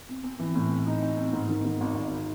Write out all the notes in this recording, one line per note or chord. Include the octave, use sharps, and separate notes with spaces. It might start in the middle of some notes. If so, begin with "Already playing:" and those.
C4
C4
E3
A2
C4
D#4
C4
C4
G#2
D#3
G#2
G#1
G#1